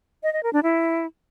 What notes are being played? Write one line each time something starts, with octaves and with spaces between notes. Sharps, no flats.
D#5
D#5
A#4
D4
E4